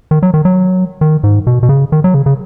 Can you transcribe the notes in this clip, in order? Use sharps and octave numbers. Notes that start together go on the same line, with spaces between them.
D#3
F#3
D#3
F#3
D#3
G#2
B2
B2
C#3
D#3
F#3
C#3
C#3